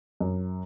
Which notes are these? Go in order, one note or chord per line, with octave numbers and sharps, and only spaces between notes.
F#2